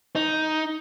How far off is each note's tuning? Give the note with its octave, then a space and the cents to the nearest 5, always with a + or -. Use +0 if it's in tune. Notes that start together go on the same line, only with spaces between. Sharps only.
D#4 +5